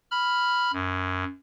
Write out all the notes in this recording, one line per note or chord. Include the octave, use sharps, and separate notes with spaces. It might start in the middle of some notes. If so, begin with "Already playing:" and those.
B5 F6
F#2